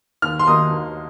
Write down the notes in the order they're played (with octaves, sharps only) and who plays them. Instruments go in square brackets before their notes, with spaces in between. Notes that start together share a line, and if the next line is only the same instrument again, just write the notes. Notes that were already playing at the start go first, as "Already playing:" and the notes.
[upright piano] D#2 F6
C6
D#3 A#3 D#4 D#6
D#2